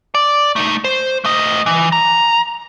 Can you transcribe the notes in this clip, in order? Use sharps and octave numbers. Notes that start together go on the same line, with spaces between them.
D5
A3 D#4
C5
A3 D#5
E3
A#5